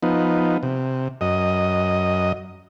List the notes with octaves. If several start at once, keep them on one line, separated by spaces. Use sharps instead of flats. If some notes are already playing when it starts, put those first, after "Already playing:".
F3 B3 D#4
C3
F#2 D#5